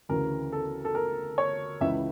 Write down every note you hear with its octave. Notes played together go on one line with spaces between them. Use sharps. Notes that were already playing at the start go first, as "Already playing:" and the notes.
D2 C#3 E3 A#4
A4
A4
A#4
C#5
C#2 C#3 E3 E5